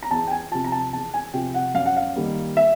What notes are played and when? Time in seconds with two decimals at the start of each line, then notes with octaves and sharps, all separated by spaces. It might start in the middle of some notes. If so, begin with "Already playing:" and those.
0.03 A#5
0.11 E2 A5
0.28 G5
0.31 G#5
0.51 C3 F3 A5
0.65 A#5
0.72 A5
0.93 E2 A5
1.14 G#5
1.34 C3 F3 G5
1.54 F#5
1.75 F#2 F5
1.86 F#5
1.97 F5
2.16 D#3 G3 A#3
2.57 E5